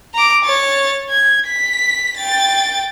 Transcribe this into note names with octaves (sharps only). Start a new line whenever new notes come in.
A#5 D6
C#5 A6
G#6
B6
G5 A6